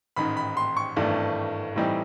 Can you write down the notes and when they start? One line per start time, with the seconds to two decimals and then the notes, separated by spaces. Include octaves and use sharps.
0.16 A1 G#2 D#3 B5
0.37 B5
0.57 C6
0.77 C#6
0.96 G#1 G2 E3 A3 D4
1.76 A2 E3 G3 C4 D#4